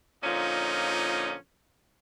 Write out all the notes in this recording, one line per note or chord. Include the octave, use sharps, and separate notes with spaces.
A#2 D3 F3 C#4 D#4